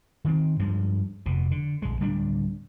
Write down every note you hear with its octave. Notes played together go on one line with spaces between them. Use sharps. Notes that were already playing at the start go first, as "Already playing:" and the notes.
D#3 C4
G2 F3 G#3
F1 B2
D3
A#1 G#3
D1 G3 B3 D4